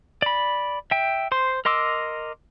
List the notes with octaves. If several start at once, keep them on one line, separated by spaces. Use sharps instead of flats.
D5 B5
E5 G5
C5 C6
A#4 D#5 C6 D6 E6